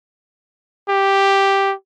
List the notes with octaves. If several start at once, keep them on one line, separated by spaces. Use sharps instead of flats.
G4